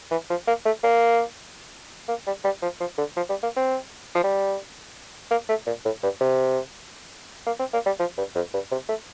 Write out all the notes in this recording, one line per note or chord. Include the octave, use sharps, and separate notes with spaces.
E3
F3
A#3
A3
A#3
A#3
G3
G3
F3
F3
D3
F3
G3
A#3
C4
F3
G3
A#3
A3
A#2
A2
G2
C3
A#3
C4
A#3
G3
F3
G2
F2
G2
C3
A3